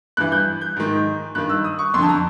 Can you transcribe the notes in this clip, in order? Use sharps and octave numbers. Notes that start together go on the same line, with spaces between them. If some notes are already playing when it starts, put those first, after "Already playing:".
G2 E3 F#6
G6
G6
G#2 D#3
G2 D#3 F#6
E6
D#6
C#6
F2 D3 C6
A5
A#5